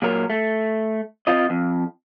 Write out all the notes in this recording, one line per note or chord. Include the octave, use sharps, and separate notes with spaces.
A#2 F#3 A#4
A3
C4 F4 D#5
F2